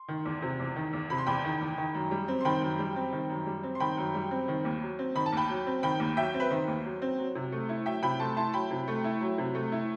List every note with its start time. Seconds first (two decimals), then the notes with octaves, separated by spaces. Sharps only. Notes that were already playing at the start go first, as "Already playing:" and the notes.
Already playing: C6
0.08 D#3
0.25 E2
0.42 C3
0.59 E2
0.76 D#3
0.93 E2
1.10 C3 B5
1.18 C6
1.26 E2 G5 B5
1.44 D#3
1.61 E2
1.77 D#3
1.94 F#2
2.11 G3
2.28 C4
2.41 C6
2.45 D#3 G5 B5
2.62 F#2
2.79 G3
2.96 C4
3.13 D#3
3.30 F#2
3.46 G3
3.63 C4
3.75 C6
3.80 D#3 G5 B5
3.97 F#2
4.14 G3
4.31 C4
4.48 D#3
4.65 D#2
4.82 F#3
4.99 C4
5.15 D#3 B5
5.26 A5
5.32 D#2 G5 B5
5.49 F#3
5.66 C4
5.83 D#3 G5 B5
6.00 D#2
6.17 F#3 E5 G5
6.34 C4
6.40 B4
6.51 D#3 C5
6.67 D#2
6.84 F#3
7.02 C4
7.18 F#3
7.35 C3
7.52 A3
7.69 E4
7.86 F#3 E5 G5
8.02 C3 G5 B5
8.19 A3 A5 C6
8.36 E4 A5 C6
8.53 F#3 G5 B5
8.70 C3
8.88 A3
9.04 E4
9.21 F#3
9.38 C3
9.55 A3
9.72 E4